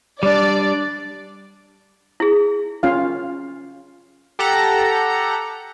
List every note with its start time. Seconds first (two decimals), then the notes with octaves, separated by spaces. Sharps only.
0.23 G3 D4 D5
2.20 E4 G#4
2.83 C#4 F4 F5
4.39 G4 A4 F#5 A#5